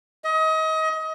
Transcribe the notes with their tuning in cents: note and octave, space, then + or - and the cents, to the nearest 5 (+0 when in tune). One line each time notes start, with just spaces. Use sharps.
D#5 +30